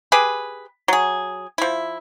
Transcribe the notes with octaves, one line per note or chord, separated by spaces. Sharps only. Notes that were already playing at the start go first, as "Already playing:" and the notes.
G4 G#4 B4
F#3 G#4
F3 E4